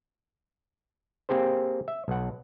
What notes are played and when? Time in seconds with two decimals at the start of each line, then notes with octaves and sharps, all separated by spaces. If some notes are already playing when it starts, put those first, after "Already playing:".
1.29 A#3 C4 G4 G#4 C5
1.88 E5
2.08 B1 F#5